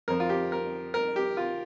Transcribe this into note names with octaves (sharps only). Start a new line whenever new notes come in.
F2 F3 A#4
F4
G4
A#4
A#4
G4
F4